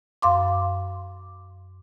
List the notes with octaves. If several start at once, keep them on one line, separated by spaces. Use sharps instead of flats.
F#2 F5 C6 D6